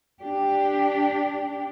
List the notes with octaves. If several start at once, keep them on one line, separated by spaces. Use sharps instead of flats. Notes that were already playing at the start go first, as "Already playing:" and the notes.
D4 G4